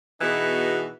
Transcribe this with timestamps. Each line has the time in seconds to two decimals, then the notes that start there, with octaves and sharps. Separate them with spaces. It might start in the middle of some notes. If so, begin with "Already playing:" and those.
0.21 B2 E3 B3 D#4 F#4 G#4